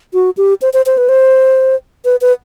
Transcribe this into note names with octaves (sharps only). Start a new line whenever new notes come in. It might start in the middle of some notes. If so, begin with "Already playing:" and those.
F#4
G4
C5
C5
C5
B4
C5
B4
B4